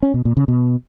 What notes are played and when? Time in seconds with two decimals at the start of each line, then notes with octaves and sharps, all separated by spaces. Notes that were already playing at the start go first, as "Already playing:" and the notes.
0.03 C#4
0.14 B2
0.25 A#2
0.37 C#3
0.48 B2